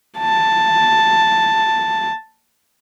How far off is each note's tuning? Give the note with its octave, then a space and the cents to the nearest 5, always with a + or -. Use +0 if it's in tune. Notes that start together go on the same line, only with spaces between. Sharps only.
A5 +5